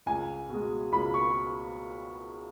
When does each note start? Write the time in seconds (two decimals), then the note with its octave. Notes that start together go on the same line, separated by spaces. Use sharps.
0.06 C#2 G#5
0.49 B2 G#3
0.92 C#2 B5
1.14 C#6